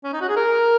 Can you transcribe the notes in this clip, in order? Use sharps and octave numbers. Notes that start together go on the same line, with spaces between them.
C#4
D#4
F#4
G#4
A#4